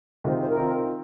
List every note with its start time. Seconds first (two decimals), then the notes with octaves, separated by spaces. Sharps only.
0.24 C3 D#3 G#3 F4 C5
0.40 C5
0.48 A#4
0.57 D#3 C4 F4